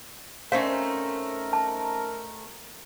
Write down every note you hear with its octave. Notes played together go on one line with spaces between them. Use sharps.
A3 C4 C#4 D#4 A#4 C5 F5
A5